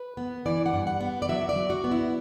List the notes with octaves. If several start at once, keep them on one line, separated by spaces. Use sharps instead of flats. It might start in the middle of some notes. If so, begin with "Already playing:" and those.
Already playing: B4
B3
E3 D5
F#5
G2
F#5
B3
D5
F#3 E5
D5
F#3
F#4
B3
E4